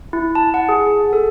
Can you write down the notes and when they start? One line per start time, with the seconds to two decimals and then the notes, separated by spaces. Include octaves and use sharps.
0.13 E4
0.35 A5
0.54 F#5
0.69 G#4
1.13 A4